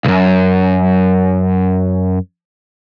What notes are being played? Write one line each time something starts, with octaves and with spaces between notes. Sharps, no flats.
B1 F#2